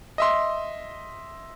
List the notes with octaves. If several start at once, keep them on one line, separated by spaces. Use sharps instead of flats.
D#5 E5 C6